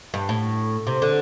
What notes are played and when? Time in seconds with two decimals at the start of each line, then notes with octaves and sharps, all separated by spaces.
0.14 G2
0.29 A2
0.87 C3
1.02 D3